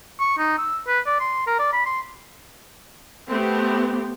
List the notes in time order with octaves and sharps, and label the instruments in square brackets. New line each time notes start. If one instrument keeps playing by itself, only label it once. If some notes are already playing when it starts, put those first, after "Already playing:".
[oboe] C#6
D#4
E6
B4
D5
C6
A#4
D5
B5
C6
[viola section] A3 B3 C4 G4